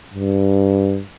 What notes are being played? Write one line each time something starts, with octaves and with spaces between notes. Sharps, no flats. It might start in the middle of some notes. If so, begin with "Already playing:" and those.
G2